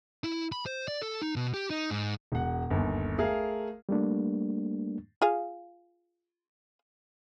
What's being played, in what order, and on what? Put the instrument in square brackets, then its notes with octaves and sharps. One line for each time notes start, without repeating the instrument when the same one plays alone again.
[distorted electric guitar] E4
B5
C5
D5
A4
D#4
B2
G4
D#4
G#2
[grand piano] E1 F#5
G1 D#2
A3 G#4 A#4 F5
[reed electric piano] G3 A3 A#3 D4
[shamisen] F4 G#4 F5